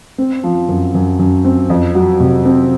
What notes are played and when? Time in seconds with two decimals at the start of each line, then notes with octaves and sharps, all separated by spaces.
0.18 C4
0.44 F3
0.69 F#2
0.94 F#2
1.19 F#2
1.44 C4
1.70 F2
1.95 F#3
2.20 C3
2.45 C4